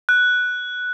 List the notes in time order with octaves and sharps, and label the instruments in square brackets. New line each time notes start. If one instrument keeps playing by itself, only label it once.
[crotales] F#6